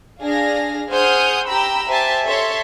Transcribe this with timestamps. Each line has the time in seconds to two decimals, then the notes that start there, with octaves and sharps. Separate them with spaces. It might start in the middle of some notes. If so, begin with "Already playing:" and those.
0.21 D4 G#4 F5 A#6
0.89 G#4 C5 F#5 D#6 F6 G6
1.46 G4 G5 A#5 B5 E6
1.88 G4 C5 E5 G#5 A5
2.25 A4 C#5 E5 C6